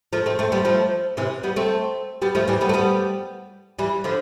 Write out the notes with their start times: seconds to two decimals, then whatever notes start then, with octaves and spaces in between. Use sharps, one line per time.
0.13 F3 A3
0.26 A3 C4
0.39 A3 C4
0.52 G3 B3
0.65 F3 A3
1.17 C3 E3
1.43 G3 B3
1.56 A3 C4
2.22 G3 B3
2.35 F3 A3
2.48 E3 G3
2.61 G3 B3
2.69 A3
2.74 G3 B3
3.79 E3 G3
4.04 D3 F3